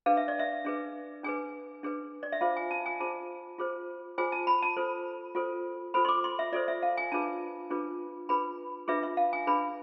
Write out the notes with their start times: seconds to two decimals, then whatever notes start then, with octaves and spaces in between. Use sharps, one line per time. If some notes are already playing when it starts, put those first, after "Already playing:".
0.06 D4 G#4 B4 F5
0.17 E5
0.28 D5
0.39 E5
0.65 D4 G#4 B4
1.24 D4 G#4 B4 G#5
1.83 D4 G#4 B4
2.23 D5
2.32 E5
2.41 F4 G#4 C5 F5
2.57 G#5
2.71 A5
2.86 G#5
3.00 F4 G#4 C5 A5
3.59 F4 G#4 C5
4.18 F4 G#4 C5 G#5
4.32 A5
4.47 B5
4.62 A5
4.76 F4 A4 C5
5.35 F4 A4 C5
5.94 F4 A4 C5 B5
6.05 C6
6.08 D6
6.24 C6
6.39 E5
6.52 F4 A4 C5 D5
6.68 E5
6.83 F5
6.97 G#5
7.12 D4 F4 G#4 B4 A5
7.70 D4 F4 G#4 B4
8.29 D4 F4 G#4 B4 B5
8.88 D4 F4 G#4 B4 E5
9.03 E5
9.17 F5
9.33 G#5
9.47 D4 G#4 B4 B5